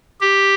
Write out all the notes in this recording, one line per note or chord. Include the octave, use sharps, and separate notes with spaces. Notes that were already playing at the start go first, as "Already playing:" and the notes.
G4